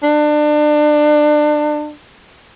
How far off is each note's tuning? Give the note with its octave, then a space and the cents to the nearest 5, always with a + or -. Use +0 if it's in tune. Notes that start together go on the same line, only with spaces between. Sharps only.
D4 +30